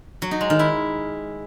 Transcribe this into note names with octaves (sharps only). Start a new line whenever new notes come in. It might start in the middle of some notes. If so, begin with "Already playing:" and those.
F#3
D#4
G#3
D#3
E4